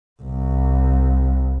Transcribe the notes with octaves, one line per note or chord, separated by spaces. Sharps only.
C2